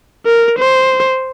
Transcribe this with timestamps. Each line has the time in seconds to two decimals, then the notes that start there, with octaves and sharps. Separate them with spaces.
0.26 A#4
0.59 C5